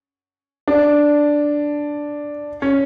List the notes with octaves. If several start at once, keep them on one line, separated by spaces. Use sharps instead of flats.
D4
C#4